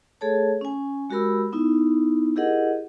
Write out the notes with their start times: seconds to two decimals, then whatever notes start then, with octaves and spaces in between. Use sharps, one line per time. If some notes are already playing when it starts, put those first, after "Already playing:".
0.21 A3 G#4 A4 C#5 A5
0.61 C#4 G#5
1.10 G#3 F#4 G4 A#4 B5 E6
1.53 B3 D#4 E4
2.36 E4 G4 G#4 A#4 D#5 F#5